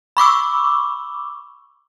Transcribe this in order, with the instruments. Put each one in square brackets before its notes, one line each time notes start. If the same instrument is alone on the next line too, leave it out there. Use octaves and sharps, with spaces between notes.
[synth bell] B5 C#6 D6 E6